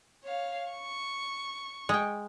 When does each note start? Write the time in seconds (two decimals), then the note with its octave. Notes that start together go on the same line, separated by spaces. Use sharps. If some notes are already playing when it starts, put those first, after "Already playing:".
0.23 C#5 F5
0.72 C#6
1.89 G#3 G5